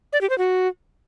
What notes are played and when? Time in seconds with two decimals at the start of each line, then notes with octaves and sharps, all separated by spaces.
0.13 D5
0.21 G4
0.30 C5
0.38 F#4